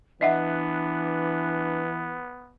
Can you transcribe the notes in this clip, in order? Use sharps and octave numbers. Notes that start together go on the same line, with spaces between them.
E3 B3 D4 D#5 E5 F#5